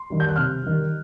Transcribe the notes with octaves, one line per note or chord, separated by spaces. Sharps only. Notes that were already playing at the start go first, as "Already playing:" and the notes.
Already playing: C6
D#3 G3
G6
F#6
C3 F6
D#3 G3